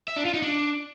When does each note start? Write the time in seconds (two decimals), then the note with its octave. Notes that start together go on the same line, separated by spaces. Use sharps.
0.08 E5
0.16 D4
0.25 F4
0.34 D#4
0.42 D4